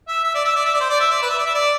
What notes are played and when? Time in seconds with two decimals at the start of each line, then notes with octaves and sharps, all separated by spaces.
0.08 E5
0.24 E5
0.34 D5
0.45 E5
0.56 D5
0.65 E5
0.73 D5
0.80 C5
0.90 D5
1.00 E5
1.10 D5
1.22 B4
1.30 E5
1.38 D5
1.46 E5
1.54 D5